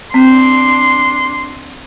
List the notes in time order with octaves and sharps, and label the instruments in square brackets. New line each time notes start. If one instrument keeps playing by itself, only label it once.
[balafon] C4 [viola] D4 C6